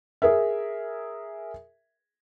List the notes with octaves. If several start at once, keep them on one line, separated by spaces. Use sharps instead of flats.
G#4 A#4 E5